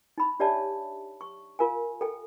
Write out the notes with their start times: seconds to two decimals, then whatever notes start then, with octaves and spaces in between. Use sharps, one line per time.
0.18 D#4 B5
0.40 D4 G4 C#5 D5 E5 A5
1.21 C#6
1.59 F4 A#4 F5 G#5
2.01 A4 G5